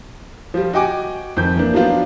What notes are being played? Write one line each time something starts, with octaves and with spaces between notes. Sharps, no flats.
F3 G3
F#4 D#5 G5 G#5 D6
F2 D#3 G6
E3 A#3 D4
F3 F#3 B3 D4 F4